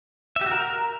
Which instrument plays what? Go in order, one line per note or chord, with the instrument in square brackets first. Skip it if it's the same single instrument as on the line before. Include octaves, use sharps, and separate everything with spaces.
[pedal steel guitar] E5
G4
F#4
A#4